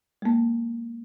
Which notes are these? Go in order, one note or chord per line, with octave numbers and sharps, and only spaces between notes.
G#3 A#3